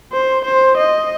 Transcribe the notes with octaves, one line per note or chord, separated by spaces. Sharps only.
C5
C5
D#5